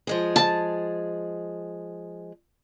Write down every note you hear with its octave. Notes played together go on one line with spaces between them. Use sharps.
F3 G#3 G#4
A5